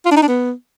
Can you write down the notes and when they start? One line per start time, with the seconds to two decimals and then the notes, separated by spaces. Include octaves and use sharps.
0.05 F4
0.11 D4
0.17 D#4
0.22 D4
0.28 B3